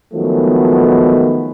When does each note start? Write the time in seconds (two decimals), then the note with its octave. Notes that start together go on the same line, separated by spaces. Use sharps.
0.14 D#3 F3 F#3 G#3 A3 B3